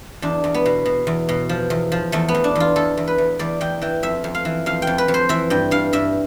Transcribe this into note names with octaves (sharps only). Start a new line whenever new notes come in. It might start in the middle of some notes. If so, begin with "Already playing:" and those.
E2 D4
E2
B3
B2
B2
E2
B2
F3
E2
F3
E2 A3
B3
E2
D4
E2 F4
E2 A4
E2
B4
E2
E2 D5
E2 G5
E3 G5
F2 E5
F2
F5
E3
F2 F5
G5
F2
B4
F2
C5
E3 E5
G2 G5
G2 F5
G2 E5